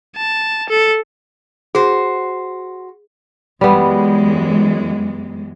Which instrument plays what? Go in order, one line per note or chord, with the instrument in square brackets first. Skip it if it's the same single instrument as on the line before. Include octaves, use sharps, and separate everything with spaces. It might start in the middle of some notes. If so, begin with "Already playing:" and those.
[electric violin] A5
A4
[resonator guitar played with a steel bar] F#4 C5 [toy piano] G#4
[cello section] F#2 E3 G#3 [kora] G3 B3